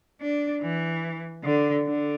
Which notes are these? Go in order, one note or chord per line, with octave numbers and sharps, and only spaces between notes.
D4
E3
D3
D3